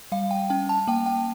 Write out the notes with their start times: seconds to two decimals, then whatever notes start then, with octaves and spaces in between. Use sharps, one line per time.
0.12 G3 F5
0.31 G5
0.50 C#4 G5
0.69 A5
0.88 A#3 G5
1.06 G5